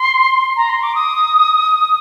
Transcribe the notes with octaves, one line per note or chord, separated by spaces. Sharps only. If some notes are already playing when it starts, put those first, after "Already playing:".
Already playing: C6
A#5
C6
D6
D#6